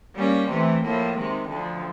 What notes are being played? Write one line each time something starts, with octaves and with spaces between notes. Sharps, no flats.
G3 A#3 C#4
C3 E3 A3
A2 F3 A#3
C3 D#3 G#3
D2 D3 F3